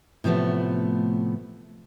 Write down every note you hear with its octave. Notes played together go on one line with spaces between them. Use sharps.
A2 C3 F3 A3 B3